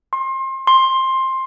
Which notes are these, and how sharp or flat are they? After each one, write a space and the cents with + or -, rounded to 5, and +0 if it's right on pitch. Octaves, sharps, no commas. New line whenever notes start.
C6 +30
C6 +15